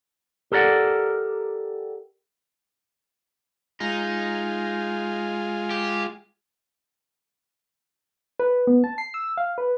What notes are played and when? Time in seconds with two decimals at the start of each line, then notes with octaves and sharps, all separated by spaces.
0.52 G4 A4 A#4 D5 F#5
3.80 G#3 D#4 F4
5.70 G4
8.39 B4
8.67 B3
8.84 A5
8.98 C7
9.14 E6
9.37 F5
9.58 B4